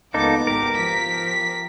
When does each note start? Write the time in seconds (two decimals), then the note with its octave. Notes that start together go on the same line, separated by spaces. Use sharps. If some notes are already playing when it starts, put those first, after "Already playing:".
0.14 C#2 A#3 B3 D#4 A4 D6
0.47 G#1 G4 A#4
0.77 F3 B6